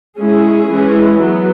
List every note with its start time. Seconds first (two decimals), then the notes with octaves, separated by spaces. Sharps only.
0.18 G#3 C#4 E4 G#4
0.70 E3 G#3 C#4 E4
1.21 F#3 B3